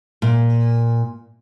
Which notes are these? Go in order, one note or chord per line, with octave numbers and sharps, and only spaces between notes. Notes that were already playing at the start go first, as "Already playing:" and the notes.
A#2